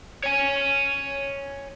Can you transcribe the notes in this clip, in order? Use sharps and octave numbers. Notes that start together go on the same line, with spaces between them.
C#5 G#5